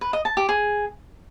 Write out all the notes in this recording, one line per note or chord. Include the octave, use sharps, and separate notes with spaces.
B4
D#5
A5
G4
G#4